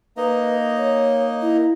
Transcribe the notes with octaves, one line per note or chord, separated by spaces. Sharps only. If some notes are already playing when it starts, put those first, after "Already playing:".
A#3 D#4 B4 D#5
C#5
E4